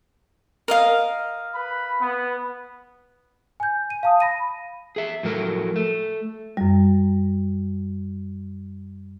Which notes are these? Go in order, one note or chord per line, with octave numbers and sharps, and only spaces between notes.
A#4 D#5 F5
B4 B5
B3
G#5 G6
D#7
F5 A5 D#6
B5 A#6 D#7
G#4 E5
A2 F3 F#3 A4 A#4
A3
F#2 G3